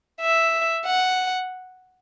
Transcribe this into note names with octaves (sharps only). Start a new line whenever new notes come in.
E5
F#5